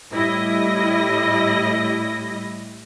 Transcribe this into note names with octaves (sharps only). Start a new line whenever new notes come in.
A2 G3 E4 D#5 A#6